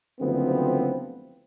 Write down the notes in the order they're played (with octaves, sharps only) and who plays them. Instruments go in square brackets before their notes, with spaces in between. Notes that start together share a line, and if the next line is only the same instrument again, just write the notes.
[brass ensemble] F#1 D2 F3 B3 C4